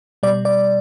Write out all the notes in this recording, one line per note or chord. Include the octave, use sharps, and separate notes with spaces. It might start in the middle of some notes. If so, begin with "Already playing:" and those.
B2 G3 D5
D5